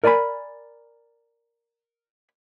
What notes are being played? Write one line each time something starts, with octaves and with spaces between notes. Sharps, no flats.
A#4 D5 G#5 A5 B5